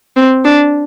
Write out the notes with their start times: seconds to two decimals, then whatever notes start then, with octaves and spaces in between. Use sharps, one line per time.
0.16 C4
0.45 D4